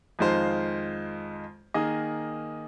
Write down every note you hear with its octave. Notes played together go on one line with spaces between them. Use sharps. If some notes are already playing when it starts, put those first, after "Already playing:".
F2 D#3 G#3 F4 C5
D#3 A#3 G#4 D#5